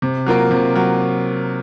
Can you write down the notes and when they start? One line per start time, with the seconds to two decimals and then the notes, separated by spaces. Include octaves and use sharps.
0.02 C3
0.26 F#3 A#3 F4 A#4
0.51 C3
0.75 F#3